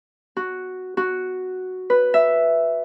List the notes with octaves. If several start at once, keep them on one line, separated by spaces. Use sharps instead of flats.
F#4
F#4
B4
E5